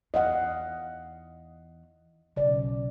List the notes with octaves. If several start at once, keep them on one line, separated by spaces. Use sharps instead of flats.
E2 D#5 F5 F#5
B1 C#3 D5